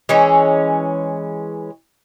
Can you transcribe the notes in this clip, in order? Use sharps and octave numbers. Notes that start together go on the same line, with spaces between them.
E3 G#3 C#4 C#5